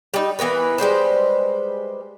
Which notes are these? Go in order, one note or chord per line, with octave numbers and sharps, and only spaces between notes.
G3 D#4
E3 B3 A#4 B4
G3 G#3 B4 C5